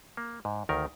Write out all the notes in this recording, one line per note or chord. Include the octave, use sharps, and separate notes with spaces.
A#3
G#2
D2 D#3 A#4